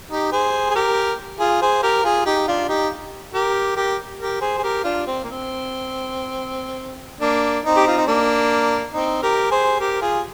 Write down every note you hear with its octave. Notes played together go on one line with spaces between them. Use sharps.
D#4 G4
G#4 C5
G#4
G4 A#4
F4 G#4
G#4 C5
G4 A#4
F4 G#4
D#4 G4
D4 F4
D#4 G4
G4 A#4
G4 A#4
G4 A#4
G#4 C5
G#4
G4 A#4
D4 F4
C4
A#3
C4
A#3 D4
C4 D#4
G4
F4
D#4
A#3 D4
C4 D#4
G4 A#4
G#4 C5
G4 A#4
F4 G#4